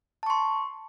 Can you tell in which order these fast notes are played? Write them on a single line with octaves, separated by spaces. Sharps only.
A5 C#6 C6